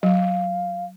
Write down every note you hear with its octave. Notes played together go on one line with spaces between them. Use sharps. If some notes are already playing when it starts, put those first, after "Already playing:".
F#3 F5